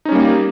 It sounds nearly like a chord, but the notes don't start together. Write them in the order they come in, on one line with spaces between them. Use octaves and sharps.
D#4 C#4 G3 A#3